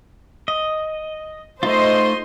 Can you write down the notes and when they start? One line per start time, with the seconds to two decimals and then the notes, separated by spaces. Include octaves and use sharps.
0.48 D#5
1.63 A3 D#4 F4 C5 D#5 C6